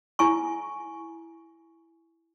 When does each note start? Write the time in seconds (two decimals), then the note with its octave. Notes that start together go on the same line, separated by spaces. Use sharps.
0.19 E4 G#5 C#6